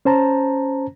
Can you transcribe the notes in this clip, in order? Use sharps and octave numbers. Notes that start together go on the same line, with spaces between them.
C#4 C5 A5 A#5